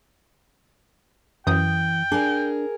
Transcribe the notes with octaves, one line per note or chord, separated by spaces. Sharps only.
F#2 E3 G5 D#6 G6
D4 G#4 A#4